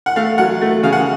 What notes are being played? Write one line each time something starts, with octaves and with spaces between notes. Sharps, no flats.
F#5
A3 F5
F#3 F#5
A3
C#3 F5
F#5